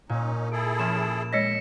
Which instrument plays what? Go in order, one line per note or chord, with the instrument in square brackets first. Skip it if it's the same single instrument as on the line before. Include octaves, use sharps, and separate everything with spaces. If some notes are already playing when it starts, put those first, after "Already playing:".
[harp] A#2 [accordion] C#4 D#4
[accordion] E4 G#4 A4 [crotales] D7
[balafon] F3 [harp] C#4 F6 [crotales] E7
[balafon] G#3 C#5 D#5 [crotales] A#6 B6 C#7